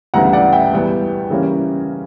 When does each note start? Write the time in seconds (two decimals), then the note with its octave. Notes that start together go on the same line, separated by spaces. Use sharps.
0.14 D2 C#3 E3 G3 B3 F#5 A#5
0.33 D5 F#5
0.53 E5 G5
0.73 E2 B2 G3 B3 E4
1.30 C#3 E3 G3 A#3 C#4